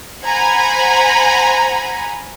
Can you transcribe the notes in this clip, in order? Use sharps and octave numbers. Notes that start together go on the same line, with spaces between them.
C5 F#5 G#5 A#5 B5